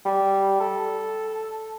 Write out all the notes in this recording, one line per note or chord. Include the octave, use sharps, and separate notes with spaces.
G3
A4